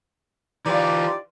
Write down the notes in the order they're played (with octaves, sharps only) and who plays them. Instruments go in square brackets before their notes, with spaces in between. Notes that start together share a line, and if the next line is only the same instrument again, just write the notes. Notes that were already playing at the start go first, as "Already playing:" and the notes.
[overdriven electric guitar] E3 F4 [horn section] D#4 G4 D5